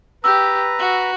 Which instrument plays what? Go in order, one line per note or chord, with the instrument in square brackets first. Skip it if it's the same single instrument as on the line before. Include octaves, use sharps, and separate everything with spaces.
[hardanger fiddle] G4 [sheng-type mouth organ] B4 A#5 [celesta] E6
[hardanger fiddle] F#4